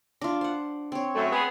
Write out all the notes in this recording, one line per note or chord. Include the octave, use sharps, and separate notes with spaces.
D4 F4
C5 F#5
C4 C#5
F#2 A3
B3 G#4